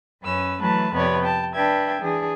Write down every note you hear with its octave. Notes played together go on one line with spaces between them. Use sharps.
F#2 C#4 B4 E6
E3 F#3 A3 B4 A5
F2 C3 B3 B4 C#5 D5
G5 A5
D4 B4 E5 G5 G#6
E3 D4 G#4